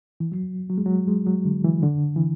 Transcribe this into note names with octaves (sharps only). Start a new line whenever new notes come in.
E3
F#3
F#3
G#3
F#3
G#3
F#3
D3
E3
D3
E3